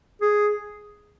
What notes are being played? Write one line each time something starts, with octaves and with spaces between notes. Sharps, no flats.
G#4